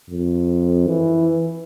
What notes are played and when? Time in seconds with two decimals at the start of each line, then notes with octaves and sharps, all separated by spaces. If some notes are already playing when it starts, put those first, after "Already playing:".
0.09 F2
0.87 E3